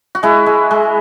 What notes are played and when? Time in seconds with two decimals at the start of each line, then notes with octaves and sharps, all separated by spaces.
0.15 F#4
0.23 G#3 E4
0.46 G#3
0.71 G#3